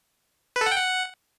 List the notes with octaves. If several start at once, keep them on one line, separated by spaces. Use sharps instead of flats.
B4
A4
F#5
G5
F#5